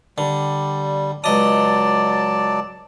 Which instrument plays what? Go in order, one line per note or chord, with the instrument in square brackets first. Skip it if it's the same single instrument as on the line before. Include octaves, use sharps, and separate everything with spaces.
[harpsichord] D3 [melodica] G3
[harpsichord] C#2 D#5 D#6 [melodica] F#3 D5 A5